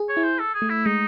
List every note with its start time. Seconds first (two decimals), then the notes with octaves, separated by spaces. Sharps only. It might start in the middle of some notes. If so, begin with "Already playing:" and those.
Already playing: G#4
0.09 C#5
0.17 E4
0.24 C5
0.39 A4
0.54 G#4
0.62 A3
0.70 E4
0.86 G#3 D#4